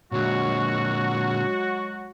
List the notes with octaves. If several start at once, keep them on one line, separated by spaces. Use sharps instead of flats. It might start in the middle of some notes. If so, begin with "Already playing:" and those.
A#2 D3 F#3 G#3 F#4